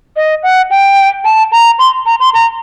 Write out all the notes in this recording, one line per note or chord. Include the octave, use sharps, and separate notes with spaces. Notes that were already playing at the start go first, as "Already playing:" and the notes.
D#5
F#5
G5
A5
A#5
C6
A#5
C6
A#5